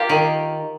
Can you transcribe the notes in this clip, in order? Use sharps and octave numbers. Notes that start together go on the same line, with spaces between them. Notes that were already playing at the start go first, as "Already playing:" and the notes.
Already playing: A#3 F4 G4
D#3